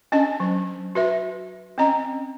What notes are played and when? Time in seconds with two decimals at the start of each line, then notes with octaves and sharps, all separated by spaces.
0.12 C#4 D4 D#5 A5
0.40 F#3
0.95 F#4 B4 E5
1.78 C4 C#4 D#5 A#5